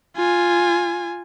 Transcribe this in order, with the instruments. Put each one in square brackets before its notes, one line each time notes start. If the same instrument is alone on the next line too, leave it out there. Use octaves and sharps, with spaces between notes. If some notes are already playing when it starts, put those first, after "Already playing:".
[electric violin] F4 G#5